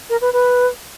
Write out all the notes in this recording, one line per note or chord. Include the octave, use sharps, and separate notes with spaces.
A#4
B4
B4